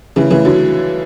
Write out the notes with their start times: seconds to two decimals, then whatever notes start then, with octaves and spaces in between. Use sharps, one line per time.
0.16 C#3 E3
0.30 C#3 E3
0.45 D3 F#3